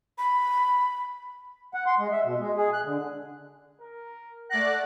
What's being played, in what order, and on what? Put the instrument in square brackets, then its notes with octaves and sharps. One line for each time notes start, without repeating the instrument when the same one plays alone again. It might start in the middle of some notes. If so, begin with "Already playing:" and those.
[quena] B5
[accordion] F#5
C6
G#3
E5
B2
G#3
G#4
F#6
D3
[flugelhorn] A#4
[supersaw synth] A3 D5 F#6 [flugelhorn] F#5 [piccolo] A#6